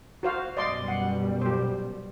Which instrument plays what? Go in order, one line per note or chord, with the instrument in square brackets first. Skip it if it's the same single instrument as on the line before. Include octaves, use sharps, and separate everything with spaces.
[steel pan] F#4 C5 F5
[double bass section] F#2 B2 G3 [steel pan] D5 D#5 C6
[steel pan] F#5
G4 C5